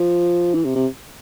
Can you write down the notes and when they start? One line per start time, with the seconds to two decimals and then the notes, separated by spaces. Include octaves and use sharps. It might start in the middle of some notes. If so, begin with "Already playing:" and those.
Already playing: F3
0.54 E3
0.65 C3
0.75 C3